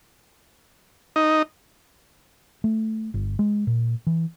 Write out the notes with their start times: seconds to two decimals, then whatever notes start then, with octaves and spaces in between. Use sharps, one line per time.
1.16 D#4
2.64 A3
3.14 G1
3.39 G#3
3.67 A#2
4.07 E3